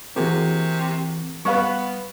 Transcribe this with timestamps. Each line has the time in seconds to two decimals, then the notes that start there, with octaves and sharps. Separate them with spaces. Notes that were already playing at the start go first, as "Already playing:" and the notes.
0.16 C3 E3 A#3 C4 F#4 G#4
1.45 G3 B3 B4 F5 C#6